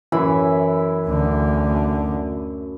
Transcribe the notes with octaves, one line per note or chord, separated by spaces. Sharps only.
F#2 E3 E4 B5
D2 D3